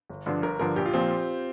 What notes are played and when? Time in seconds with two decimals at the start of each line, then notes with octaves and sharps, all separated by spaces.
0.10 G1
0.26 G2 D3 F3 D4
0.42 G1 A#4
0.59 G2 D3 F3 D4 A#4
0.76 A#1 G4
0.86 F4
0.94 A#2 F3 C4